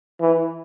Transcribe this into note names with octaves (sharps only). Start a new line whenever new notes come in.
E3